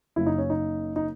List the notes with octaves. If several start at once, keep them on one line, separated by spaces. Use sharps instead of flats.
F#1 F#2 C#3 E4
D#4
C#4
D#4
D#4